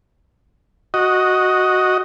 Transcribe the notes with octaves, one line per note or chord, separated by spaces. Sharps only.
F#4 D#5